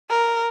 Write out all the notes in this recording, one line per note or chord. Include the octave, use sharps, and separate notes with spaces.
A#4